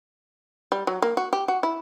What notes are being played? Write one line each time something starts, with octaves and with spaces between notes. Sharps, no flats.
G3
F#3
A#3
F#4
G4
F#4
E4